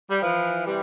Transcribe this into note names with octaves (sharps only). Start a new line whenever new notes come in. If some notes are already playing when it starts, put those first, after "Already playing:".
G3
E3 F3
C3 E3 G3